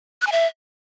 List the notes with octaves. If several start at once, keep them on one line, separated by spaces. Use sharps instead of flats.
F#6
G#5
E5